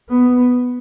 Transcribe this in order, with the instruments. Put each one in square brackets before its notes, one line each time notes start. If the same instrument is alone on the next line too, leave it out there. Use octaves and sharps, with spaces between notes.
[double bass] B3